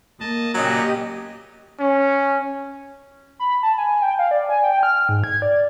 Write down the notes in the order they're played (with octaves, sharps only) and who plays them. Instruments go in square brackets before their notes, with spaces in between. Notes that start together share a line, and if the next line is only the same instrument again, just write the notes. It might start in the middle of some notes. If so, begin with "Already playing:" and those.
[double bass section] A#3 [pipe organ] D#5 A5
[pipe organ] A#2 C#3 [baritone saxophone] F#3 [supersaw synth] G4 D#5
[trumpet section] C#4
[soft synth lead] B5
A5
G#5
G5
F5
D5
G#5
G5
F6
G#2
G#6
D5